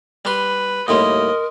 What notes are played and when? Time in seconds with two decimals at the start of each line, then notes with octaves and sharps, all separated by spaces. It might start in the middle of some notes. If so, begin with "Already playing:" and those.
0.25 G3 B4 C6
0.88 D#2 A2 G3 A#4 D#5 C6 D#6